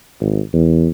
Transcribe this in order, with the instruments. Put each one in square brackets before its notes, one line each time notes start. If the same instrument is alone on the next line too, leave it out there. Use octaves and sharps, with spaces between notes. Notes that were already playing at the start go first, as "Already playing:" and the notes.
[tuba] G#1
E2